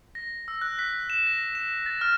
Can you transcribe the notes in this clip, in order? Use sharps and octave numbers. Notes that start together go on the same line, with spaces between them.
A#6
E6
F#6
B6
E7
A#6
E7
A6
F6